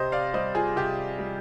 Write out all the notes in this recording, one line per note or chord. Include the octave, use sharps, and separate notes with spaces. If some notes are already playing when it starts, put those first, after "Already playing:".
Already playing: C3 C5 D#5
D5 F5
G3 C5 D#5
F4 G#4
C3 G4
G3